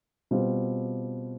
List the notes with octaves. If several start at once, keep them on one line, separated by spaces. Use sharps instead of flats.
B2 G3 C4 F4